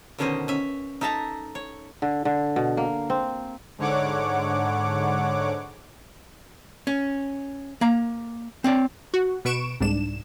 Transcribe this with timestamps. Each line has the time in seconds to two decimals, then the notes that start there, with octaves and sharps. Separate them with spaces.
0.18 B2 D3 D#3 C#4 C5 D#5
0.48 C#4 E5
1.01 D#4 A4 E5 A5 A#5
1.55 C#5
2.02 D3
2.25 D3
2.56 B2
2.77 A#3
3.10 C4
3.78 G#2 D3 C#5 F#5 D6
6.87 C#4
7.81 A#3 A#5
8.64 C4 C#5 D5
9.14 F#4
9.45 B2 B4 C#6 D7 E7
9.80 C2 G#2 D4 E7